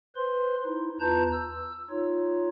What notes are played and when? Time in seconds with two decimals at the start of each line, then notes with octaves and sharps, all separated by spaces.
0.16 B4 C5 C6
0.65 D#4 E4
1.00 E2 F4 B4 A5 A#5 G6
1.32 E6
1.90 D#4 F4 C#5